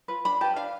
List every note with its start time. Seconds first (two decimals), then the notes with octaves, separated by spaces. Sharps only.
0.08 F4 B4
0.25 D4 B5
0.41 G4 B4 A5
0.56 D4 F5